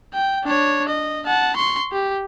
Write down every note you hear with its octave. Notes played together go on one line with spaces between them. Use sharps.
G5
D4 C#5
D#5
F#5 A5
C6 C#6
G4